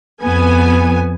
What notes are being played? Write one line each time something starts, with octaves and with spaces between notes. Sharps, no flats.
F2 B3 G#5